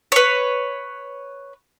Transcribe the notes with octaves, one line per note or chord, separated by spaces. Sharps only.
B4 C#5